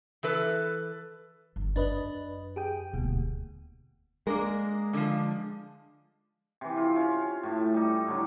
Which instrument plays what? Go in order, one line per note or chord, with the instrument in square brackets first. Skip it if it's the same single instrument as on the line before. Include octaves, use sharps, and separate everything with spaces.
[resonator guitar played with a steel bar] E3 A4 B4
[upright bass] G1
[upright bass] F#2 [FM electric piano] D4 B4 D#5
[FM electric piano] G4 G#4 G5
[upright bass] D#1 D2 [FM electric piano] B2
[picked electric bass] G#3 [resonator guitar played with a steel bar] A#3 D4 A#4
[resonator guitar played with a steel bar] D3 E3 F3
[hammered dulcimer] C3 E3
F4
C#4
A2 A3
G3 D#4
A2 D3 F#3